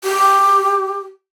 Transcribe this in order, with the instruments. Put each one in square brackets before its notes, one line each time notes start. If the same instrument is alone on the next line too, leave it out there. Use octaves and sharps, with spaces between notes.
[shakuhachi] G4